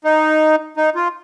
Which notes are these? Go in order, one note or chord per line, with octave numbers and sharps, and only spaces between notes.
D#4
D#4
F4